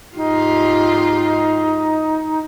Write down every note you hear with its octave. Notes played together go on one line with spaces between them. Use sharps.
G#2 D#4 F4 G4